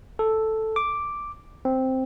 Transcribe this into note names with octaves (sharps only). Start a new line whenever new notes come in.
A4
D6
C4